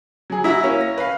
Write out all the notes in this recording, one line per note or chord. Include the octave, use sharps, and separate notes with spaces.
F#3 G#4
E4 F#4 E5 A#5
A#3 C#4
A#6
B4 F5